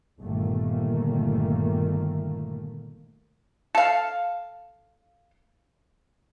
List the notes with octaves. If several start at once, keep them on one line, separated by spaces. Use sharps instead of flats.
G1 A#2 D#3 A3 A#3
A4 F5